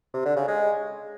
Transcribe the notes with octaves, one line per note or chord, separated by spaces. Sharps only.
C3
D3
C#3
G#3